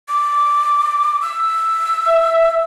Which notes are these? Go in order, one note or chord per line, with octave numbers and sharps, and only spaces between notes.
D6
E6
E5